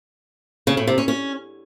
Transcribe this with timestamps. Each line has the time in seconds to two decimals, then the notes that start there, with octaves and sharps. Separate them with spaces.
0.67 C#3
0.77 A2
0.87 C3
0.98 C#4
1.08 C#4